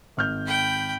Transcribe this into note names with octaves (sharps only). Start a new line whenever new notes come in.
G#1 F6 G6
G5 B5